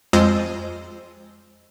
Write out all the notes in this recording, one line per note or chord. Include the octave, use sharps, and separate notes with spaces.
F2 G#3 F4 C5 D#5 E6